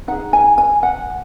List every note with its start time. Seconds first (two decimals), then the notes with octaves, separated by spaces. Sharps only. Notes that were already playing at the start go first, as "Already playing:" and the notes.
0.08 D#4 G#4 F#5
0.33 G#5
0.58 G#5
0.83 F#5